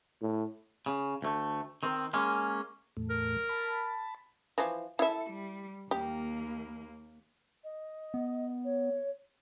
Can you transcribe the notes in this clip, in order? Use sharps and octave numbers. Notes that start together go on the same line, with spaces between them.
A2
C#3
D2 A3
D#3 C4
G#3 A#3 C#4
E2 A2 A3
A#4
A5 B5
E3 F3
E4 A4 E5
G3
D#2 A#3 G4
D#5
B3
C#5